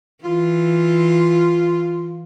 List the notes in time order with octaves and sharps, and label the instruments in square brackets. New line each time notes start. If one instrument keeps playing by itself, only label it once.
[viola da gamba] E3 [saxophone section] F4